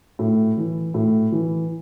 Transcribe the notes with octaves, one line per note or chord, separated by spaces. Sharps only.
A2
E3
A2
E3